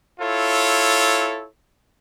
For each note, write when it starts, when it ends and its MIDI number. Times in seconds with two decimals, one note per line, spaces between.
0.20 1.46 64
0.20 1.46 65
0.20 1.46 69
0.20 1.46 73